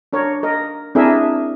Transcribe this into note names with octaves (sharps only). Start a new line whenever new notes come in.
D4 A#4 C#5
A#4 D#5
C4 D4 E4 G#4 A#4 E5